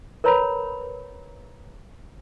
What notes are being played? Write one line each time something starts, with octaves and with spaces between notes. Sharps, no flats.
A#4 B4 C#5 A#5 B5